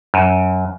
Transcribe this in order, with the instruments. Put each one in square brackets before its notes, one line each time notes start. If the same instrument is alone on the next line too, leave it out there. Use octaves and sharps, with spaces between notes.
[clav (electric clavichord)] F#2